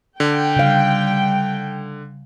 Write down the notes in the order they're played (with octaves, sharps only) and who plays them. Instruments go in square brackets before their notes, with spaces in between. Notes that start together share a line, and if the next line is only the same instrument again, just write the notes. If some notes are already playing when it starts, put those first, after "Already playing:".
[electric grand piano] D3 [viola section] G5
[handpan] C#3 F5 [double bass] G3